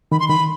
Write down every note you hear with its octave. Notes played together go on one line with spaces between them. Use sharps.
D#3 B5
C6
D#3 B5